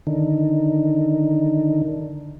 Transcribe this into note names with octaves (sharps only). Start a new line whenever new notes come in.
D3 D#3